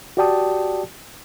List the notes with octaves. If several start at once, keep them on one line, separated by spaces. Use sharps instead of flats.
F#4 G4 D5 G5 A5 D#6